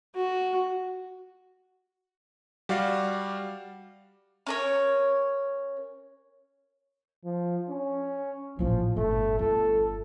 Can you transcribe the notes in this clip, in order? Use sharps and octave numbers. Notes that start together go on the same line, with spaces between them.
F#4
G3 F#4 D5 F5
C#4 A#4 C#5
F3
C#4
A1 A#2 F3
G1 A3
G1 A4